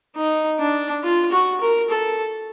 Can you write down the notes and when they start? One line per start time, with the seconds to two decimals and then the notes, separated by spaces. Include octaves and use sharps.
0.16 D#4
0.60 D4
1.03 F4
1.32 F#4
1.61 A#4
1.90 A4